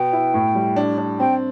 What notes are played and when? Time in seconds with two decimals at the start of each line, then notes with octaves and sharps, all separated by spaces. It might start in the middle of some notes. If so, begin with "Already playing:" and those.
Already playing: B2 B3 G5
0.13 E4
0.34 A2
0.55 G3
0.76 D4
0.98 D4
1.20 C4 G5